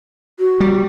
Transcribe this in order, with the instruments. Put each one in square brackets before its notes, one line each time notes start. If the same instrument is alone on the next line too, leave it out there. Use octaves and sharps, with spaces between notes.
[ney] F#4
[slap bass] G3